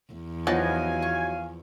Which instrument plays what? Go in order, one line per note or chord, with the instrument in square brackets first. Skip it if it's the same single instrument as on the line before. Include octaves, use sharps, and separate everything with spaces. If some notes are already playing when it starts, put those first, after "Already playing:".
[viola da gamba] E2
[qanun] F3 B3 [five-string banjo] F#3 D#4 A5 [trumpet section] F5 G#5
[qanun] C#6